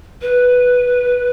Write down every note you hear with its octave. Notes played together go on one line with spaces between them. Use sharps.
B4